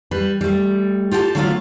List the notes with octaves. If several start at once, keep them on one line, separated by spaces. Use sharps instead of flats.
G3 B4
G3 A3
F4 G4 A4 F5 A5
D3 F#3 A3 B3 C#4 F4